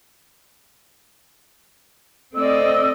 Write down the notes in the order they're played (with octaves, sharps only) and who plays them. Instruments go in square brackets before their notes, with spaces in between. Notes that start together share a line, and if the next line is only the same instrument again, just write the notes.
[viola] A3 D5 [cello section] C4 D#5 [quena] E6